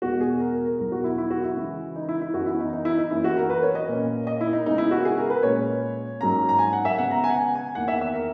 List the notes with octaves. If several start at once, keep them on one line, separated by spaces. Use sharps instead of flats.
E2 B2 G#3 F#4
G#4
A#4
A#4
A#4
E2 B2 F#3 A#4
F#4
E4
E4
F#4
E4
C#3 E3 G#3
D#4
E4
E4
F#2 E3 B3 F#4
E4
D#4
D#4
E4
D#4
F#2 E3 A#3 C#4 E4
F#4
A#4
B4
C#5
D#5
A#2 A#3 C#4
D#5
E4
D#4
C#3 G#3 B3 D#4
E4
F#4
G#4
A#4
B4
A#2 G#3 C#4 C#5
G#2 F#3 A#3 C#4 A#5
A#5
G#5
F#5
E5
C#3 G#3 B3 F#5
A#5
G#5
F#5
G#5
G#5
E2 D#3 A#3 F#5
E5
E5
A#4